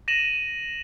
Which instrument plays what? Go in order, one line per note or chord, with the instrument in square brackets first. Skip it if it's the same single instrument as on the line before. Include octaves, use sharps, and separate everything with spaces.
[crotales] A#6 D#7 E7 F#7